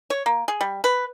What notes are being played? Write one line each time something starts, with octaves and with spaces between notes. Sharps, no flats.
C#5
A#3
G#4
G3
B4